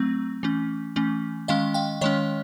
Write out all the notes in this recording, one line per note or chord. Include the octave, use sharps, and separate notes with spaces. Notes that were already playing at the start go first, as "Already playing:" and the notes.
Already playing: F#3 A3 C4
E3 A3 C#4
E3 A3 C#4
D#3 G#3 C#4 D#5 F5
F5 G5
D#3 G#3 C#4 C#5 D#5